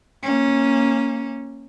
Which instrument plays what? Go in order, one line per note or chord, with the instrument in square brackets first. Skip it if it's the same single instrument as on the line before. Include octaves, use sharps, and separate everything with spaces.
[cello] A#3 C#4